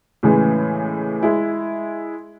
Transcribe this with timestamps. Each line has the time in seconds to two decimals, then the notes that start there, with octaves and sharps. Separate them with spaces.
0.23 A2 C#3 E3 G#3
1.23 G#3 E4